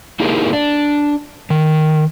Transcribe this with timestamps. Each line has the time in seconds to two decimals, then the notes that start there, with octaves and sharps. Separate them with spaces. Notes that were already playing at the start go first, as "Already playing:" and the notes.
0.20 A#3 D#4 E4 G4 G#4 A#4
0.53 D4
1.50 D#3